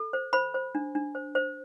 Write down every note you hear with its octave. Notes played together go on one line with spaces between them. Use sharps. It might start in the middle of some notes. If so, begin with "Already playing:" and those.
Already playing: A4
C5
C5 B5
C5
D4
D4
C5
C5